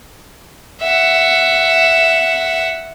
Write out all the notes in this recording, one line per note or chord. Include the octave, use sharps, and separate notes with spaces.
E5 F#5